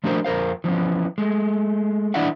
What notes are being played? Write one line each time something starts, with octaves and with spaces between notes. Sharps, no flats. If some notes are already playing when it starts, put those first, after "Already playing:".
F3 A3 D4 F#4 A#4 C5
F2 A#4 C5 F5
E3 F3 B3 C#4
G#3 A3
E3 D4 E4 D5 E5 F#5